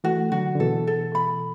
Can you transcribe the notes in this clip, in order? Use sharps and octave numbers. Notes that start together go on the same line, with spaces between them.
E3 A3 F#4
D3 F#3 F#4
D3
B2 E3 A4
A4
B5